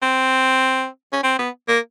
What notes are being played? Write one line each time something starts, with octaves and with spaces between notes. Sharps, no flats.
C4
C#4
C4
B3
A#3